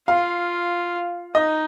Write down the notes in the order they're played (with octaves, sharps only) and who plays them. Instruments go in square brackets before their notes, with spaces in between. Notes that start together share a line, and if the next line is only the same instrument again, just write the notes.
[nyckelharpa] F4 [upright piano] F5
[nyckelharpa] D#4 [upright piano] D#5